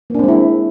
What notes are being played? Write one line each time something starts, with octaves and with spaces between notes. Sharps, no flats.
G#3 A#3 C4 D4 E4